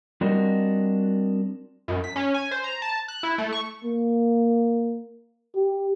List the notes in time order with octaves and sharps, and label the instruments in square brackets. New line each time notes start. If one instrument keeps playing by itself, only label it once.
[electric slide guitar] G3 C4 D4 F#4 A#4 D#5
[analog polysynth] F#2
B6
C#4
G#5
C5
A#5
A5
F#6
E4
A3
C#6
[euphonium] A#3
G4